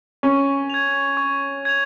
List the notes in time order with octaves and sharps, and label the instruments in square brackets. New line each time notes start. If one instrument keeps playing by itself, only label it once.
[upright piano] C#4 [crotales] C#6
[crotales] G#6 F7
C#6
G#6 F7